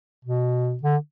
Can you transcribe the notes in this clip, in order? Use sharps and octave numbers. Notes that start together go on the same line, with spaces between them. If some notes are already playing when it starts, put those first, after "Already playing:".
B2
D3